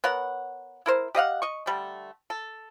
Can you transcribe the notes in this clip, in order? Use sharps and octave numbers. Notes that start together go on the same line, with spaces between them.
B3 A#4 C#5 F#5
E4 A#4 C5
G4 D#5 F5 F#5
D#5 C#6
D3 G3 A3
A4